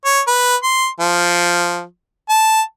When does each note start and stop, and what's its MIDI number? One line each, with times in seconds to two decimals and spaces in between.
0.05 0.20 73
0.27 0.56 71
0.63 0.86 84
1.00 1.83 53
2.29 2.61 81